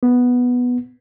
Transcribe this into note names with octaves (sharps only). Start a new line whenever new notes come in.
B3